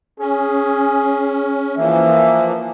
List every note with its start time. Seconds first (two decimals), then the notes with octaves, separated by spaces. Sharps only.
0.19 C#4 G#4
1.77 E3 F3 A#3 E5